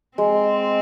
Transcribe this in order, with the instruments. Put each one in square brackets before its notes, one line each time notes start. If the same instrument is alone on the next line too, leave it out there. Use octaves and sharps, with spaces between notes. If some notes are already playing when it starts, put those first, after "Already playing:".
[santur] G#3 [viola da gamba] C4